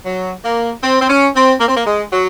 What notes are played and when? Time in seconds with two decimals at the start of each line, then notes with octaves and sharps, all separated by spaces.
0.06 F#3
0.44 A#3
0.83 C4
1.01 C4
1.09 C#4
1.35 C4
1.60 A#3
1.68 C4
1.77 A#3
1.86 G#3
2.12 F#3